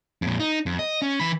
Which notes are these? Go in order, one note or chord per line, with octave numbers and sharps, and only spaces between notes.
F2 A#2
D#4
F2
D#5
C#4
E3 B5